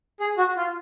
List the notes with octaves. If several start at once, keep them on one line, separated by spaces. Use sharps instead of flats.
G#4
F#4
F4